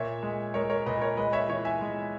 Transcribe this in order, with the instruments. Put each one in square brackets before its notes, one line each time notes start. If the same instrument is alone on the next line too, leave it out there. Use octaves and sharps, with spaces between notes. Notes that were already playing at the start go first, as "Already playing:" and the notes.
Already playing: [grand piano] A#2 C#5 E5
G#3
G#3 A#4 C#5
A#4 C#5
A#2 B4 D#5
A#4 C#5
G#3 B4 D#5
C#5 E5
E3 C#5 E5
E5 G#5
G#3